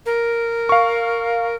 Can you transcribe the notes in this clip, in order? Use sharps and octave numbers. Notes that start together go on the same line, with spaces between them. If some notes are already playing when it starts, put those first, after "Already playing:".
A#4
F5 C#6